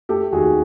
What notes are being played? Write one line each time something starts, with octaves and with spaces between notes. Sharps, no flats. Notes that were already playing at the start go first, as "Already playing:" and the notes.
A3 G4 A4
D#2 F#4 G#4